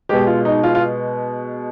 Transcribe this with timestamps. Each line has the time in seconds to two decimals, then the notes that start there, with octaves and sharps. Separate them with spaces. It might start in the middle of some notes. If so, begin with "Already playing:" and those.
0.09 B2 G#3 G4
0.27 F4
0.45 D#4
0.63 F4
0.75 F4